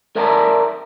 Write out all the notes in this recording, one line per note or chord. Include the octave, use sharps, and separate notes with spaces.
A#4 D5 E5 G5 A5 A#5